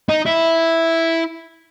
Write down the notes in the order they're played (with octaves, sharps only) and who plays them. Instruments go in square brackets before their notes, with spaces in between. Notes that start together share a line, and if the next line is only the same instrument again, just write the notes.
[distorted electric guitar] D#4
E4